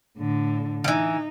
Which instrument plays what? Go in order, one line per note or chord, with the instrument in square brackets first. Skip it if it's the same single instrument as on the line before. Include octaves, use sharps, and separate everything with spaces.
[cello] A2 D3
[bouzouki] E3 F3 [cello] D#4